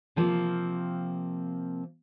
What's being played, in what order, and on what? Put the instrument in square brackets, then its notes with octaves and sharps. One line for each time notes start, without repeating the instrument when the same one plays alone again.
[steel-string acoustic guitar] C3 F3 A#3 C4